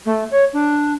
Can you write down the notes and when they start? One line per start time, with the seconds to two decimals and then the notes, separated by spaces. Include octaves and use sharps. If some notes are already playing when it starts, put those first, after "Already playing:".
0.05 A3
0.31 C#5
0.52 D4